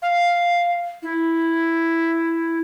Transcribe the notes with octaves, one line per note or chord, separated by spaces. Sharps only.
F5
E4